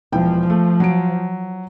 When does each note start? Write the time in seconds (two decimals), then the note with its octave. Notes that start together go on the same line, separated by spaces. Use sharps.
0.12 E1 E3 F3 G5
0.50 A3
0.80 F#3 D7